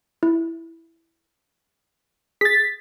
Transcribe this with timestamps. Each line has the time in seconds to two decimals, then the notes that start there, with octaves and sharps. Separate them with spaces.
0.23 E4
2.41 G#4 A6 B6